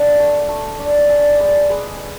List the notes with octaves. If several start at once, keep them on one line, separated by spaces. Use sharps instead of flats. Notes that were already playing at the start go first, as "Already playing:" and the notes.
Already playing: D4 F#5 A5
A3
A3
D4
D4 E5 G#5
G#3 B4 D5
G#3 G#4 B4